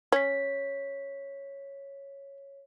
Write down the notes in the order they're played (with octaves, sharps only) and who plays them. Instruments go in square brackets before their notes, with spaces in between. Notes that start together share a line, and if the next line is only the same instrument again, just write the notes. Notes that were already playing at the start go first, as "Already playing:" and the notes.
[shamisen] C#4 [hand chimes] C#5 B6